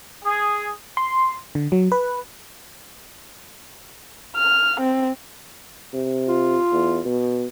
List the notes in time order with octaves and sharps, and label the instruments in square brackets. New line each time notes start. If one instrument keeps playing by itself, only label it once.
[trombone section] G#4
[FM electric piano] C6
D3
F#3
B4
[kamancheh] F6
C4
[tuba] C3
[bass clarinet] F4
[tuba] E2
B2